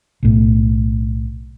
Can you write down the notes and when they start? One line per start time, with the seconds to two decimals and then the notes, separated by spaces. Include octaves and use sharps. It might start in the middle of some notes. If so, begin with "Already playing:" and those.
0.23 B1 A2